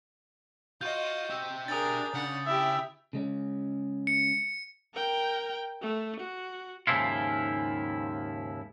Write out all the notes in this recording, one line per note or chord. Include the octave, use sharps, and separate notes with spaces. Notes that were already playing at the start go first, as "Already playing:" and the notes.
F4 F#4 D#5 G6
G4 E5
D4 G#4 A#4 D#6 A6
C#3 F#5
E4 G4 E5
C#3 G#3 C#4
C#7
A#4 G5
A3
F#4
D#2 G#2 C#3 F3 E4 F4